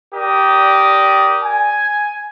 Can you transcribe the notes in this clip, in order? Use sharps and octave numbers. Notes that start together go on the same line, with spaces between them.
G4 A#4 D5 D#6
G#5